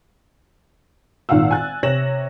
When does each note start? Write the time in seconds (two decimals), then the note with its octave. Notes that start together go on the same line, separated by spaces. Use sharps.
1.29 G#1 A#2 D#3 F5 F#5 E6
1.51 G#5 F#6 A6
1.83 C3 C#5 A#6 E7 F#7